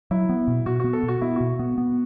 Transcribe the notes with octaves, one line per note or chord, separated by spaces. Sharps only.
F#3 E4
B3
B2
B2 F#4
B3 F#4
A4
B2
F#4
B3 E4
B2 F#4
B3
B3